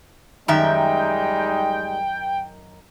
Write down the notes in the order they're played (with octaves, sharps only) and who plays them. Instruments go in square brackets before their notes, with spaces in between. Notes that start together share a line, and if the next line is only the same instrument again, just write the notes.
[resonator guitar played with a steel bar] F#2 D#3 E5 [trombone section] G3 G#3 D#4 [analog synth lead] G5